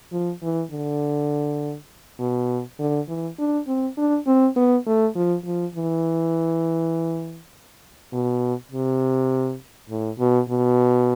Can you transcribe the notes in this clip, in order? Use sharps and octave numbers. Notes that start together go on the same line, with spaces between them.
F3
E3
D3
B2
D3
E3
D4
C4
D4
C4
B3
A3
F3
F3
E3
B2
C3
A2
B2
B2